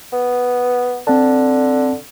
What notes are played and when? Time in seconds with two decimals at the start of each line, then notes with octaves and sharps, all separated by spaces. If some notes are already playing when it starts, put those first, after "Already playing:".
0.13 B3
1.07 D3 C4 A5